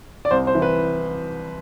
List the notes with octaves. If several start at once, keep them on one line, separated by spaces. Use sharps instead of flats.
D5
C2 C5
C5
E3
B4